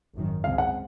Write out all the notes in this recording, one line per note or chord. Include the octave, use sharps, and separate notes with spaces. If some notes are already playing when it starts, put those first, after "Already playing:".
G#1 F#2 D#3
C#2 C#3 G#3 C4 F5
F#5